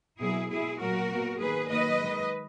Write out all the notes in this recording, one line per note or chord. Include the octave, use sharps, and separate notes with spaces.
B2 F#3 A#3 E4 G#4
B2 G#3 E4 G#4
A#2 F#3 A#3 F#4 A#4
B2 F#3 A#3
D#3 A#3 G#4 B4
D#3 F#3 A#3 B4 D#5
D#3 G#3